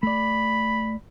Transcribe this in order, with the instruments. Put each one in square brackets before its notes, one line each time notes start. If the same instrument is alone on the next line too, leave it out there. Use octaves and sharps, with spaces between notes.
[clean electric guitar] A3 D5 [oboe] B5